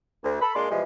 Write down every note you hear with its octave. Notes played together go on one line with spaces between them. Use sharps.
D2
A4 B5
A#2 G#3 A#3 D4 D5 C6
B2 E3 F3 G3 G#3